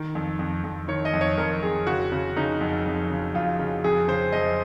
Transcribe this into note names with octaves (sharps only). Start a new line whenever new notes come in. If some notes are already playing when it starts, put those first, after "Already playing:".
Already playing: D#3
F2
F2
F2
D#3 C#5
D#5
F2
C#5
F2 A#4
F2 G#4
C#3 F#4
C#3
C#3 D#4
F2
F2
C#3
F2 F4
C#3
F2 G#4
C#3 C5
F2 D#5